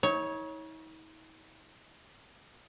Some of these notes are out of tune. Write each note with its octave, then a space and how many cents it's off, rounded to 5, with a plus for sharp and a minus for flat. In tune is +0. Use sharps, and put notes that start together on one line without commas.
D#4 +45 C#5 +0